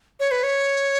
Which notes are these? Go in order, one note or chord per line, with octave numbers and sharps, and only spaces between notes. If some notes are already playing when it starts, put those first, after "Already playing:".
C#5
B4
C#5